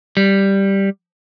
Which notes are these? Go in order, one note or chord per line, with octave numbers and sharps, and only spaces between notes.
G3